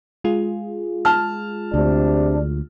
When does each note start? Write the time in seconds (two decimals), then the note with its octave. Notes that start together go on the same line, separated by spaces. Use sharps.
0.24 G#3 F4 G#4
1.05 A5 F6
1.74 D2 C3 D4